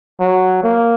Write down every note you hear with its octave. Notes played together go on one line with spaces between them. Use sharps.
F#3
A#3